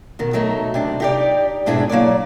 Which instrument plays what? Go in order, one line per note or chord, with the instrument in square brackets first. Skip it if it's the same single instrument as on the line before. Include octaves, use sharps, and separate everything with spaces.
[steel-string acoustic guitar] B2 D#3
F#3 A3 D#4
C3 D4
D#4 G4 D5
G#2 B2 D4 E4 G#4
F#3 A#3 C#5 D5